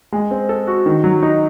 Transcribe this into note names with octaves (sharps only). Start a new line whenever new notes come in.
G#3
C4
A4
F#4
D#3
F#3
D#4